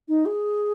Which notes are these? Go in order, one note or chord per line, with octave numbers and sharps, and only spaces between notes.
D#4
G#4